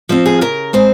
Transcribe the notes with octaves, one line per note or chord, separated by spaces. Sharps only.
F3 C4 C5
G#4
C#3 A#4
G#3 C4 C5